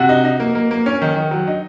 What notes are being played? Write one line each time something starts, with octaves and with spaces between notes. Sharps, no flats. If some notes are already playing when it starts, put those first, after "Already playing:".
Already playing: C3 F#4 F#5
D#4
D#4
A#3
A#3
A#3
C#4
D#3
D#3
F#3
D#4